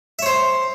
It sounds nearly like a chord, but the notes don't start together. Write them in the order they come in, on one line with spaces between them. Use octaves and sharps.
E5 C#5 C5